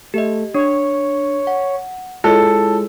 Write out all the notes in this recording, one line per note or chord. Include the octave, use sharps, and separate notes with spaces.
A3 G4 D#5
D4 C#5
F#5
G#3 E4 F4 A4 C#5